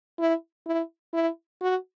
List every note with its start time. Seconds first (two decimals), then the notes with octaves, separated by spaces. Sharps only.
0.19 E4
0.66 E4
1.14 E4
1.61 F#4